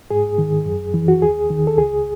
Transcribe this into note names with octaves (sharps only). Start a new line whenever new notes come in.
G#2 G#4
D#3
F#2
E3
F#4
D#2 G#4
D#3
A4
C#2 G#4